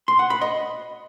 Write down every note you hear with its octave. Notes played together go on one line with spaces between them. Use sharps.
C6
F#5
B5
D#5